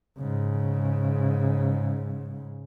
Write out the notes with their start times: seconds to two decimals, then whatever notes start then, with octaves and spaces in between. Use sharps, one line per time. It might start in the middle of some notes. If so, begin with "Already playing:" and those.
0.18 G#2 C#3